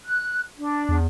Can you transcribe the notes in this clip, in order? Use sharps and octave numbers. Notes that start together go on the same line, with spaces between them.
F#6
D4
E2